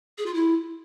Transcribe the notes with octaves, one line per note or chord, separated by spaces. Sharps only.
G#4
F4
E4